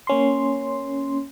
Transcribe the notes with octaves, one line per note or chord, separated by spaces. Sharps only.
A#3 C#4 C6